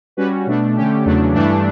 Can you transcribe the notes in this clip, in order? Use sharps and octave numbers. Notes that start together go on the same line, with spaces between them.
G3 C#4 F#4 B4
B2 A3 D4
D3 A3 C#4 G4
E2 C#3 F#3 A3 D4
G2 E3 A3 D4